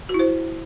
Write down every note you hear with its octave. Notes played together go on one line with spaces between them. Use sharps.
F#4
E4
C5